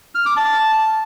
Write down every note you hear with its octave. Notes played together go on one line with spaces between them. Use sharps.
F6
D6
A5